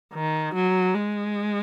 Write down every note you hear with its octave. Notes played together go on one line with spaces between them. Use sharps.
D#3
F#3
G#3